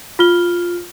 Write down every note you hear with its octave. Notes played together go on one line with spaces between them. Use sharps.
F4 F6 G7